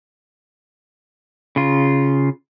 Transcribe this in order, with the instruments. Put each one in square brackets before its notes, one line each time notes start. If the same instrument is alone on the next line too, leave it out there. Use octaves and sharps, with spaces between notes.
[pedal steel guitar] C#3 F4